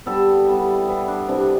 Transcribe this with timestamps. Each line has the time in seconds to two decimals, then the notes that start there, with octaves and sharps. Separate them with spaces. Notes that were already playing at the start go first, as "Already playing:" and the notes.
0.06 D3 G3 B3 A4
0.47 E3 G3 B3
0.87 E3 B3
1.08 D4
1.28 C3 E3 B3 D4